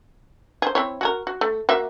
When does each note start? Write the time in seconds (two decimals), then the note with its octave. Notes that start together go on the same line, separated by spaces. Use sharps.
0.62 G#4 C5
0.75 C4 E4 C#5
1.01 F#4 G#4 A#4
1.27 F#4
1.41 A3
1.69 A#3 F#4 E5